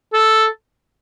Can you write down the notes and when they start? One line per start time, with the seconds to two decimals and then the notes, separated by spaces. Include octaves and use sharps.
0.13 A4